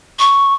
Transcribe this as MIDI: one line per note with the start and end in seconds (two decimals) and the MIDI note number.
0.19 0.54 85